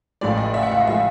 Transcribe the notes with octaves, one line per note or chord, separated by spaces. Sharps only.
A1 A2 F3 G#3 D5
D#5
E5
F#5
F5
D#5
A2 F3 G#3 E5